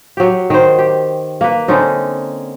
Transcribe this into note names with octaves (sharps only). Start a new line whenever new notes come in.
F#3 G4
D#3 C5
G4
A#3 B4
D3 C4 C#4 D#4